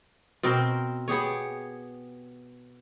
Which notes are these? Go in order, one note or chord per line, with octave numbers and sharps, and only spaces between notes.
B2 C4 A#4 C5
B3 G4 G#4 C#5